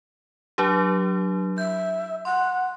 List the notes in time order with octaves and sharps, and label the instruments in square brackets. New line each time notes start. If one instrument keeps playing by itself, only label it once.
[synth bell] F#3 D4 G4
[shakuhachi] E5 [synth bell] G6
[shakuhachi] F#5 [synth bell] C6